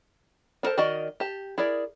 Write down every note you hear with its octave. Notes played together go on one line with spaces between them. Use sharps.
D4 A4 A#4 C5 A5
D#3 F#4 A#4 D5 D#5
G4 A5
E4 G#4 A#4 D5